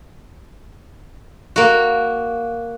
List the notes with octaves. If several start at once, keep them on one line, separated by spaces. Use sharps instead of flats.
A#3 F#4